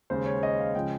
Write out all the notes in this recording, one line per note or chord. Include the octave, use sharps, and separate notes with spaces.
D#2 C#3 G#3 C5
C#5
D#5
F5
C#3 F3 G#3 G5